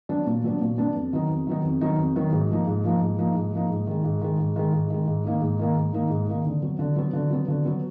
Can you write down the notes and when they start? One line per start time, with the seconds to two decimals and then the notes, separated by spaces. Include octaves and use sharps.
0.09 F#3 B3 D4
0.26 A#2
0.44 F#3 B3 D4
0.61 A#2
0.78 F#3 B3 D4
0.95 F2
1.13 D#3 F#3 B3 D#4
1.29 F2
1.47 D#3 F#3 B3 D#4
1.64 F2
1.81 D#3 F#3 B3 D#4
1.99 F2
2.16 D#3 F#3 B3 D#4
2.32 G#2
2.50 F3 A#3 D#4
2.67 G#2
2.84 F3 A#3 D#4
3.01 G#2
3.18 F3 A#3 D#4
3.36 G#2
3.53 F3 A#3 D#4
3.70 G#2
3.87 D#3 G#3
4.04 G#2
4.21 D#3 G#3
4.39 G#2
4.56 D#3 G#3
4.73 G#2
4.90 D#3 G#3
5.07 G#2
5.25 D#3 A#3 D#4
5.42 G#2
5.59 D#3 A#3 D#4
5.76 G#2
5.93 D#3 A#3 D#4
6.10 G#2
6.28 D#3 A#3 D#4
6.45 D3
6.62 F#3 B3
6.79 D3
6.96 F#3 B3
7.13 D3
7.31 F#3 B3
7.48 D3
7.65 F#3 B3